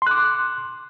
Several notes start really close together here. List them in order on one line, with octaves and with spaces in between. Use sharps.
C6 F#6 D6